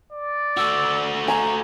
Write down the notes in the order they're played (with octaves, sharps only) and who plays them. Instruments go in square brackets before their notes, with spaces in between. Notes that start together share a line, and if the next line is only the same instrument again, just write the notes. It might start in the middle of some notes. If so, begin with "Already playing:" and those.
[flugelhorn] D5
[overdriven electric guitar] A3 F#4 [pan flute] E6
[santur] G#5 [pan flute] A#5